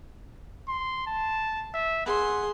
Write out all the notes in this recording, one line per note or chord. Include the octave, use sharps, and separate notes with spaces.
C6
A5
E5
G#4 F#5 C6